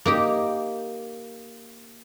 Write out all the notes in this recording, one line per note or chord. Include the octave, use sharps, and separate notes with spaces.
A#3 D#4 G4